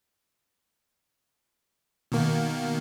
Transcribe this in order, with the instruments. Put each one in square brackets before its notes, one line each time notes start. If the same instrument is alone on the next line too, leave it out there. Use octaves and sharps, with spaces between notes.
[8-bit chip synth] B2 D#3 A#3